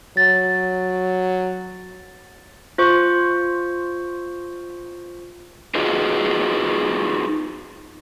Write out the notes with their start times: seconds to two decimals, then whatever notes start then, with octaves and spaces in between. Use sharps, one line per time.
0.17 F#3 A6
2.78 F4 C5 C#6
5.75 D#4 F4 F#4 G#4 B4 D#5